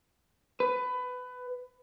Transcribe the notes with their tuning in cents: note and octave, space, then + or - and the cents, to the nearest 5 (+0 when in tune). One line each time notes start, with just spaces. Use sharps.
B4 +20